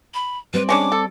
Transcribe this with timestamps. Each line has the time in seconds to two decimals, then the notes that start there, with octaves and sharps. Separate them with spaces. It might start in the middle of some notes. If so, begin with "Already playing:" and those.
0.14 B5
0.54 G3 C4 B4 D5
0.69 G#3 C#4 D4 D6
0.92 A4